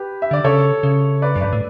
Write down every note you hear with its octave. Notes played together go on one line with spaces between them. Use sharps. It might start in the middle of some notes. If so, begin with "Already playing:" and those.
Already playing: G4 B4
E5
D3 D5
C#3 A4 C#5
C#3
B4 D5
F#2
G2 B4 D5
A2